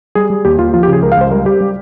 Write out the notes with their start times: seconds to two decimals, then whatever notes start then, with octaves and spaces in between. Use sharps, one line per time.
0.15 G3 G#4
0.30 G3
0.45 D#2 G4
0.59 D#2 F4
0.74 F3 F4
0.83 G4
0.88 C#3
0.93 G#4
1.02 C#2 A#4
1.12 F5
1.17 C#2 C5
1.31 G3 A#4
1.45 G3 G4
1.61 G3